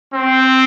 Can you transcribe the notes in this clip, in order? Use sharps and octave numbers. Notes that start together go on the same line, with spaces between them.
C4